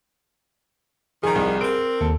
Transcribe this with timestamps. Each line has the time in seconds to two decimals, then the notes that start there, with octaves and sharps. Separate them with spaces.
1.23 D#3 F3 G#4 G#5 A#5
1.36 C2
1.61 C4 A#4 D7
2.01 D#2 A4